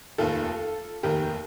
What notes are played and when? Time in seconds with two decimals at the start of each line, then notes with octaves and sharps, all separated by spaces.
0.18 F1 D#2 D#3 F4 A4
1.03 F1 D#2 D#3 G4 A#4